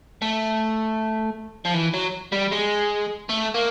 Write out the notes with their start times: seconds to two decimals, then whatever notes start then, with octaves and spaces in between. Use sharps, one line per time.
0.22 A3
1.66 F3
1.75 E3
1.94 F#3
2.32 G3
2.51 G#3
3.29 A3
3.54 A#3